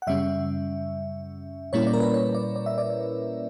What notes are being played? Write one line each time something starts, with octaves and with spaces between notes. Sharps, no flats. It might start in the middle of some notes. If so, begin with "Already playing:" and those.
F#5
F#2 C#3 G3 C#4 E5
A#2 G3 A#3 C#4 E4 C#5
D5
A#4
B4
C#5
D5
D5
E5
D5